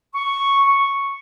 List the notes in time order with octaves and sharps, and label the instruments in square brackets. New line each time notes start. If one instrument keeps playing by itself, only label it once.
[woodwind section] C#6